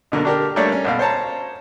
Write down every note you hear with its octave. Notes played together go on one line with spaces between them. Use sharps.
B2 D3 F#3 A#3
D4 G4 A#4
G3 A3 A#3 D4 C#5 D5
C#4
B1 B2 F5
C5 C#5 A5 A#5